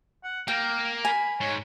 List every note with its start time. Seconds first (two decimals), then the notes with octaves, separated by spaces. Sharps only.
0.23 F#5
0.48 A#3 A#4 G5
1.05 G#5 B5
1.41 G#2 C#5